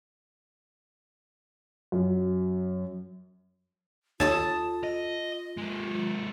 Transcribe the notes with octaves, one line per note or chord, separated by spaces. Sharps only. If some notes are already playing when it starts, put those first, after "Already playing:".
F#2
D#2 F4 A4 C#5 A5 D#6 A6
D#5
G#3 A#3